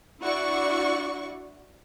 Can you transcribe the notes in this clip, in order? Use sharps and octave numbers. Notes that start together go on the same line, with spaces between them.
D4 E4 F#4 D5 C#6